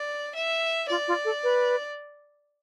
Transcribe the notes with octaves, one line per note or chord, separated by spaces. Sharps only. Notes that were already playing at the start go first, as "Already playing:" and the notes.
Already playing: D5
E5
F4 D5
F4
A4
B4